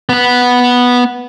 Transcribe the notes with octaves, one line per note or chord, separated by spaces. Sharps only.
B3 B4